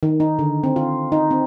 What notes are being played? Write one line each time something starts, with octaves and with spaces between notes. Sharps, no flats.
D#3
D#4
D3
C4
F4
D#4
C4